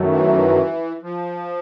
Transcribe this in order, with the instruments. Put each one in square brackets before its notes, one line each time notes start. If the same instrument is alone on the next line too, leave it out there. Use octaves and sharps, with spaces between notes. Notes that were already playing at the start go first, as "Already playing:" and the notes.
Already playing: [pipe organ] F#2 D#3 F#3 A3
[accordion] E3
F3